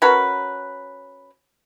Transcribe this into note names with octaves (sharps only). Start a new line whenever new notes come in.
C#4 F#4 A#4 B4